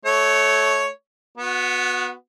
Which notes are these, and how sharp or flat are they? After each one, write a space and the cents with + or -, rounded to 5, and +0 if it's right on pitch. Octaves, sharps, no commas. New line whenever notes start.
A3 -20 C#5 +0
B3 +0 F#4 -30